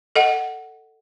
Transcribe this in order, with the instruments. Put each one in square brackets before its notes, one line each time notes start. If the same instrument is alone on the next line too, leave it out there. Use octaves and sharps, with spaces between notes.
[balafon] A4 D#5 F#5